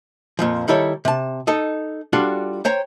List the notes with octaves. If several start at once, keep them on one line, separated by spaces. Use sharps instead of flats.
F2 A#2 F3
D#3 G3 E4 A4 C#5
C3 A5
D#4 A4 D#5
G3 D4 F4 F#4 A4
C5 C#5 G5 A#5